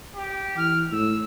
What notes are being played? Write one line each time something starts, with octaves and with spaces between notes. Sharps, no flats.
G4
E3 F6
A2 E6